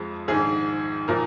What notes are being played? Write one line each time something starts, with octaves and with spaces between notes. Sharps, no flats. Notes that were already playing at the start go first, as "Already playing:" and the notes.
Already playing: F2 F3 G#3
A#1 G#2 D#3 G#4
A#2 F3 A#4